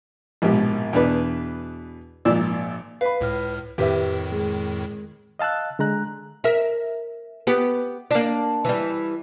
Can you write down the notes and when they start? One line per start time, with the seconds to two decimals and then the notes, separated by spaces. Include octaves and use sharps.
0.42 A#1 G#2 B2 G4
0.93 E2 B2 D4 B4
2.25 G#1 A#2 F3 D5 E6
3.01 B4 F5 B5
3.21 C#2 A2 F6
3.78 F2 A2 D#3 G4 B4 E5
4.32 G#3
5.39 D#5 F5 A5 E6 F#6
5.79 D3 G#3 A#5 F#6
6.44 A#4 E5
7.47 B3 G4
8.11 A#3 D4
8.65 E3 G3